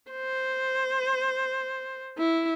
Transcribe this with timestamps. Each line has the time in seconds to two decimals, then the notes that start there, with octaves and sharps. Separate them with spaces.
0.11 C5
2.18 E4